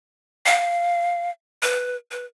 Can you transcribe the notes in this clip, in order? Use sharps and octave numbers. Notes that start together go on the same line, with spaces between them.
F5
B4
B4